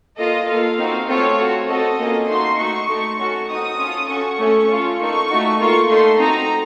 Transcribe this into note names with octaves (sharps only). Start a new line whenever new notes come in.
A#3 F4 A4 D#5
A#3 F4 A4 F5
C4 D#4 F#4
A3 C4 F4 A4 C#5
C4 F#4 A4
C4 F#4 A4 D#5
A#3 C#4 F4 A4
A3 D#4 F#4 C6
A3 D#4 F#4 C#6
A3 D#4 A4
C#4 F#4 A4
C4 D#4 F#4 D#6
C#4 F4 A4
C#4 F#4 A4 C#6
A3 C#4 A4
C#4 F4 A4
A#3 D#4 A4 C#6
A3 D#4 F#4
A#3 F4 A4 C#6
A3 D#4 A4 C6
C4 D#4 F#4 A4 A#5